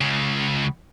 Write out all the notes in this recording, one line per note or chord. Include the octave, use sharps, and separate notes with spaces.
C#2 C#3